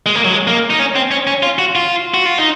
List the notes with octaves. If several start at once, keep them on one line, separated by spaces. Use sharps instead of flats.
G#3
A#3
F#3
G#3
A#3
D#4
C#4
C4
C#4
C#4
F4
F#4
F4
F#4
F4
D#4